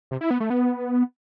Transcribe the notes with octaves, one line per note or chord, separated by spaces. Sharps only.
C3
E4
B3
A3
B3